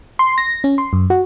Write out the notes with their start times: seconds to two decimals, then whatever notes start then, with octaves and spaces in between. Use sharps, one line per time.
0.19 C6
0.38 A#6
0.64 C#4
0.78 C6
0.93 F#2
1.10 F#4